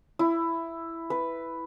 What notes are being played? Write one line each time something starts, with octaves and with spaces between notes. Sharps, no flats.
E4
B4